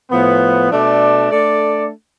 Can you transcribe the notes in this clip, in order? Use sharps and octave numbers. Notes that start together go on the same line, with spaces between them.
A2 F3 B3
B2 A3 D4 A4 D5
A3 D4 A4 D5